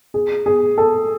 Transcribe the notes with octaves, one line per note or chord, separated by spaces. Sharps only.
G#4
G#4
A4